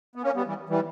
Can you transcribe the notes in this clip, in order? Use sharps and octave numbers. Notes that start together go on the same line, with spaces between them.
B3
A#3 C#4
G3 B3
E3 G3
E3 G3